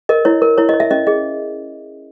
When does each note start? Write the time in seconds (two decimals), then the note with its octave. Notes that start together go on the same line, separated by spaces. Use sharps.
0.09 A#4 D#5
0.25 E4 C#5
0.42 A#4
0.58 E4 C#5
0.69 D#5
0.74 C#5
0.80 E5
0.91 C#4 D#5
1.07 G#4 D#5